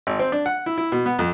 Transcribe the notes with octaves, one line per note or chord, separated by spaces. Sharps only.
G#1
C4
D4
F#5
E4
E4
B2
B3
F2